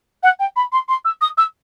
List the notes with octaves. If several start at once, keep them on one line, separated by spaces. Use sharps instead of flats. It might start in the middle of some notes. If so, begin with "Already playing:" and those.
F#5
G5
B5
C6
C6
E6
D#6
E6